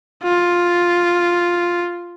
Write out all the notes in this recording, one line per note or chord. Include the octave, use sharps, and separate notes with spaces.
F4